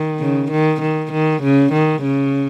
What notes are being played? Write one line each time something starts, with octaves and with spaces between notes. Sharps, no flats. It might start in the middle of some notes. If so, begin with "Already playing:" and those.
Already playing: D#3
C#3
D#3
D#3
D#3
C#3
D#3
C#3